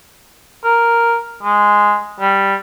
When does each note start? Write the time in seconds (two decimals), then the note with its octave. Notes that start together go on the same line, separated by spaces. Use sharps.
0.64 A#4
1.43 G#3
2.20 G3